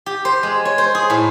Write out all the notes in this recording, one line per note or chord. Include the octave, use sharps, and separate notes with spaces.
G4
C5
G#3
C#5
C5
G#4
A2